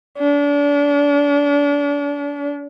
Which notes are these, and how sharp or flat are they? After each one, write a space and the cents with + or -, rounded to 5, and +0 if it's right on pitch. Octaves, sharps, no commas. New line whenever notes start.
D4 -35